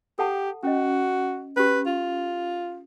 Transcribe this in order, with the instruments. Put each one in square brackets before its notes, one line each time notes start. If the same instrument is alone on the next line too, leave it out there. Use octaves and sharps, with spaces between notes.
[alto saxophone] G4 [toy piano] A4 F#5 A5
[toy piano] C#4 D#5 [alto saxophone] F#4
[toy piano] C#4 G4 [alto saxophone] B4
[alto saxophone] F4